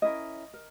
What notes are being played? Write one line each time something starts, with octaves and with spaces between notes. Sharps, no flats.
C#4 E4 A#4 D#5
A#4